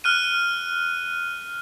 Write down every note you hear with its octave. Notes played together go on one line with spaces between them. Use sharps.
F6 F#6 D#7